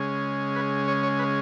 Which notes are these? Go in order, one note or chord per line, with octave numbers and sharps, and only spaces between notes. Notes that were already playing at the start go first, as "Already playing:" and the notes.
Already playing: C#3 G#3 C#4
B4
C#5
C#5
B4